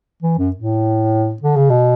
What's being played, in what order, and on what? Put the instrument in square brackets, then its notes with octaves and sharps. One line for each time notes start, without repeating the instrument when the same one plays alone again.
[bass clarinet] E3
F#2
A2
D3
C#3
B2